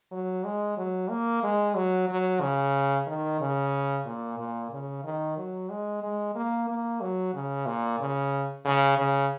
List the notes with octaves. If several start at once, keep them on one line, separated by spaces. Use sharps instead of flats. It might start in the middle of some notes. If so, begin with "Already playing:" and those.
F#3
G#3
F#3
A#3
G#3
F#3
F#3
C#3
D#3
C#3
A#2
A#2
C#3
D#3
F#3
G#3
G#3
A#3
A#3
F#3
C#3
A#2
C#3
C#3
C#3